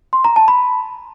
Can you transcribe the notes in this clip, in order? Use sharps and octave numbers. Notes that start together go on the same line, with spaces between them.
C6
A#5
A5
B5